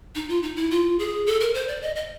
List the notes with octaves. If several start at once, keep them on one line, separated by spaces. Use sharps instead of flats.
D#4
F4
D#4
E4
F4
G#4
A4
A#4
C5
D5
D#5
D#5